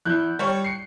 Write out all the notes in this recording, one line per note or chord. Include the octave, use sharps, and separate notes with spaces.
E2 E4 F#6 G6
G3 C#5 D5 G5
C7 C#7